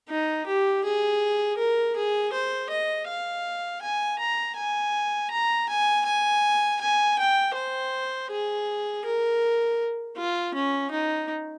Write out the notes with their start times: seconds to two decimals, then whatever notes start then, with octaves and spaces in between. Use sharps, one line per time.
0.09 D#4
0.46 G4
0.84 G#4
1.57 A#4
1.96 G#4
2.32 C5
2.70 D#5
3.07 F5
3.82 G#5
4.19 A#5
4.57 G#5
5.31 A#5
5.69 G#5
6.06 G#5
6.81 G#5
7.18 G5
7.55 C5
8.31 G#4
9.05 A#4
10.17 F4
10.54 C#4
10.91 D#4